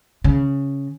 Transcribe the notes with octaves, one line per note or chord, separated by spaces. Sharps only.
C#3